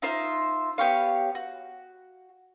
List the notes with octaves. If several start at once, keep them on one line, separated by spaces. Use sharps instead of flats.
D#4 F4 C5 E5
B3 G4 C#5 F5
F#4